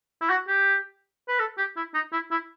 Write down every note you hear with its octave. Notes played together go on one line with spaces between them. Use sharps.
E4
F#4
G4
B4
A4
G4
E4
D#4
E4
E4